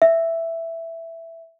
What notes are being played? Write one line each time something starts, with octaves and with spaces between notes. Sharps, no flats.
E5